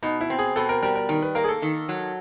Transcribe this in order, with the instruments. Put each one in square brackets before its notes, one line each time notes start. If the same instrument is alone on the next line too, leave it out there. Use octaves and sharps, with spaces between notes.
[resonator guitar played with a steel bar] B2 [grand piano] D#4
[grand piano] E4
[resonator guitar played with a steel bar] C4
[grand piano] G#4
[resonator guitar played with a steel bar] B2 [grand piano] A4
[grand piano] A#4
[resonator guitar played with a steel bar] G3 [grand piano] A#4
[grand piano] A#4
[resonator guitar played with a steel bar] D#3 [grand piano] A#4
[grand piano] B4
[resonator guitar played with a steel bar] A#3 [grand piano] A#4
[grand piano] G#4
A4
[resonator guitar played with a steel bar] D#3
F#3